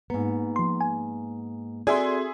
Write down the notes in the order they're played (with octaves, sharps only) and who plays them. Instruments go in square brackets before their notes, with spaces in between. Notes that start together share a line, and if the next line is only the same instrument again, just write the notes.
[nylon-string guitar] G#2 B3 [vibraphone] A#3
[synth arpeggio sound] F3 C6
G#5
[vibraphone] C4 F#4 A4 [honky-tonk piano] G#4 E5 C6 [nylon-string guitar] D5